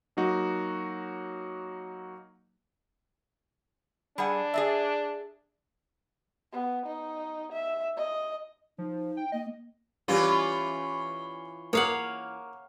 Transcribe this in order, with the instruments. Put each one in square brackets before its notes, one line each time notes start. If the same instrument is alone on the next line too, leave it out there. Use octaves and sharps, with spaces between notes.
[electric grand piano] F#3 A#3 D#4 F#4
[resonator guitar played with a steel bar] G3 G#4 F#5 [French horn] D4
[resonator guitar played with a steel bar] G#4 D5 E5
[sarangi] B3
D#4
E5
D#5
[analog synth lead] F3 [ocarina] D#4
[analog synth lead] G5
[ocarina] A#3 [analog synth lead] D#5
[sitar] E3 C#4 F4 [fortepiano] G3
[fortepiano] A#3 D#6 [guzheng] C#5 F5 F#5